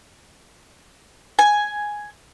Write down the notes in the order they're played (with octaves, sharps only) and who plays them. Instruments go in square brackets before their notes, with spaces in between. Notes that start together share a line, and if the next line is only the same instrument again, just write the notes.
[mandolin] G#5